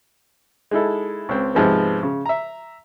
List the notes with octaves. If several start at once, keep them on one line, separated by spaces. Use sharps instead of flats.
G#3 D#4 E4 A4
C#2 C4
G#2 C3 F3 G#3 B3
C#3
E5 A#5